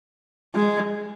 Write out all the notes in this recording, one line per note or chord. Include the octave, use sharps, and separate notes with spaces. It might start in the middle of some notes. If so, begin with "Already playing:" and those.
G#3